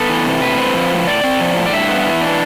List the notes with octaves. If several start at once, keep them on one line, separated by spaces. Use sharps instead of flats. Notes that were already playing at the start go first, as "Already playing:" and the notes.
Already playing: B3 A4
E3
C3
A2 B4
C4
F3
A2
A2 D5
C4
F3
A2
D5
G2 E5
B3
E3
D4